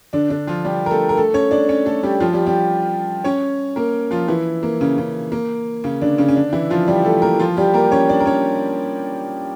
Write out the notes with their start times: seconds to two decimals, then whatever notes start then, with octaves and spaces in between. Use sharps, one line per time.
0.13 D3 D4
0.30 D3 D4
0.47 F3 F4
0.65 G3 G4
0.86 A#4
0.91 A3 A4
1.09 A#4
1.17 A3 A4
1.34 C#4 C#5
1.51 D4 D5
1.69 C#4 C#5
1.86 A3 A4
2.03 G3 G4
2.20 F3 F4
2.33 G3 G4
2.46 G3 G4
3.24 C#4 C#5
3.76 A#3 A#4
4.11 F3 F4
4.28 E3 E4
4.63 A#3
4.81 C#3 C#4
4.98 C#3 C#4
5.32 A#3
5.84 C#3 C#4
6.02 D3 D4
6.18 C#3 C#4
6.29 C#4
6.36 D3 D4
6.53 E3 E4
6.70 F3 F4
6.88 G3 G4
7.05 A3 A4
7.22 A#3 A#4
7.39 F3 F4
7.57 G3 G4
7.74 A#3 A#4
7.92 C#4 C#5
8.09 D4 D5
8.20 A#4
8.26 C#4 C#5